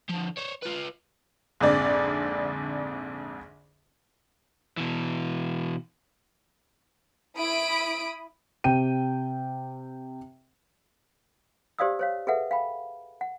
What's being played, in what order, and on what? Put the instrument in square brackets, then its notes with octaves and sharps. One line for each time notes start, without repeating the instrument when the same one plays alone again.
[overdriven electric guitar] D3 F3
C5 C#5
F4 B4
[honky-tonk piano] A#1 F2 G#2 D3 D5
[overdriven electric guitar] B2 E3
[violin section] E4 B5 D#6 D7
[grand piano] C3 G5 D#7
[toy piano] G4 C5 D5 F5 D#6 E6
C5 C#5 F5
G#4 A4 B4 E5 F#5
F5 G5 B5
F#5